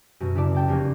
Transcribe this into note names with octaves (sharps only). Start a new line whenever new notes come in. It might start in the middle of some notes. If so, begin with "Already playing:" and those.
F#2 B2
C#3 E4 D5 A5
A4 G5 A5
F1 A#3 C#4